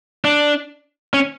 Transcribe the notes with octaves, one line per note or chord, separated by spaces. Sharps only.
D4
C#4